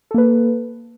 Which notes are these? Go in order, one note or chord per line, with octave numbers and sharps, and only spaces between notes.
A#3 A4 B4